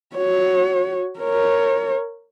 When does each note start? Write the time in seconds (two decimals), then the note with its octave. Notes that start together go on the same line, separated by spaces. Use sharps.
0.16 F#4 C#5
1.20 A#4 C#5